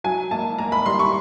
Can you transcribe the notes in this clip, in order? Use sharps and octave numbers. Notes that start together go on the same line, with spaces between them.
F#3 G#5
A#3 A5
A#3 A#5
B5
G3 C6
C#6